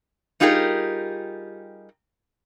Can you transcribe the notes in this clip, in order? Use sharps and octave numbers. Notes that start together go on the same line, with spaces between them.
G3 D#4 F4 G4 G#4 A#4